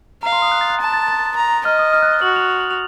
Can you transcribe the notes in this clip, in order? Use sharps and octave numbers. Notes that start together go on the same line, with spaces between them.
F5 A#5
C6
D#6
F#6
A6
F#6
A5 A6
A6
A6
A#5
D#5 F6
D#6
F6
F#6
A6
F#4 F#7
F7
F7
F#7
F7